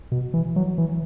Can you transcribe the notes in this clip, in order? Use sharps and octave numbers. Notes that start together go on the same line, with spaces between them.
B2
E3
F#3
E3